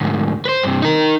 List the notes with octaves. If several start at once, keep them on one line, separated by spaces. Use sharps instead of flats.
D2 G#2
B4 C5
G2 C3
D#4 A#4